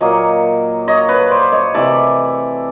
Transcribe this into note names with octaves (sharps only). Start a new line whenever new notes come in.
A#2 F#3 A#3 C#5 D#5
C#5 D#5
B4 C#5
C5 D5
C#5 D#5
C3 E3 A3 D5 E5